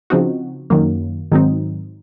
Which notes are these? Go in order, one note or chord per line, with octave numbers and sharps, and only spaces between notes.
C#3 F3 C4 D#4 F#4
F#2 D#3 F#3 A#3
G#2 D#3 F#3 C4 D#4